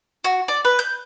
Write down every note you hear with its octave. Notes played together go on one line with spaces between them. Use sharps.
F#4
D5
B4
G6